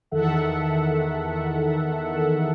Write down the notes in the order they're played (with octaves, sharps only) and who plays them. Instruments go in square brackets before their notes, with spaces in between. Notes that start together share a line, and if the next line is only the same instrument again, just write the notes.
[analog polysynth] E2 D#3 A4 E5 F#5